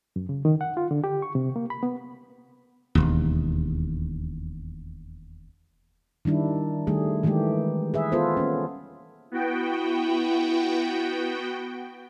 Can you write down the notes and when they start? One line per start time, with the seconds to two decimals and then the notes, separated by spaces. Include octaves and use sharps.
0.16 F#2
0.29 C#3
0.45 D#3
0.61 F#5
0.77 F4
0.91 D3
1.04 G4
1.22 C#6
1.35 C3
1.56 A#3
1.70 B5
1.83 B3
2.95 E1 D#2
6.25 D#3 G3 D4 E4
6.87 D#3 G3 A3 G#4
7.23 D#3 E3 G#3 A3 G4
7.94 G#4 B4 E5
8.12 B3 F4 A4 B4 C5
8.37 A#3 C#4
9.31 B3 E4 F#4 G5